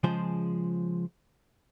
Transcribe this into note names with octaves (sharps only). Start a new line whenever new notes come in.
C#3 F3 G#3 F4 G#4 C5